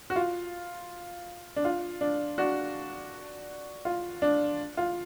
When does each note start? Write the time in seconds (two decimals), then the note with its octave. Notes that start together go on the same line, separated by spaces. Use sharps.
0.10 F#4
0.16 F4
1.56 D4
1.65 F4
2.01 D4
2.38 D4 F#4
3.85 F4
4.22 D4
4.77 F4